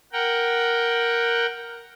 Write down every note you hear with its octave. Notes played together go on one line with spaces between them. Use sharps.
A#4 F#5 G5